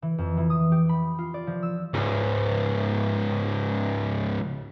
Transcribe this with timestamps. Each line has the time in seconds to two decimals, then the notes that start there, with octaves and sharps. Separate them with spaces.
0.02 E3
0.18 F2
0.37 E3
0.50 D#6
0.72 G4
0.89 B5
1.19 F4
1.34 D5
1.47 F3
1.63 E6
1.94 C#2 G#2